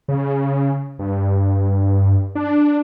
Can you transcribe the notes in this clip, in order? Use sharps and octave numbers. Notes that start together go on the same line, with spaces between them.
C#3
G2
D4